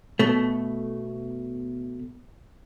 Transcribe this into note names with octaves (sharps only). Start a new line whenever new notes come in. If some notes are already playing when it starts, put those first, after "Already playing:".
B2 A3